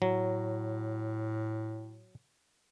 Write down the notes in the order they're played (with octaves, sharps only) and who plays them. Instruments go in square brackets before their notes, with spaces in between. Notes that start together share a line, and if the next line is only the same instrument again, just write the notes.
[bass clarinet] A2 [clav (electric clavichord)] F#3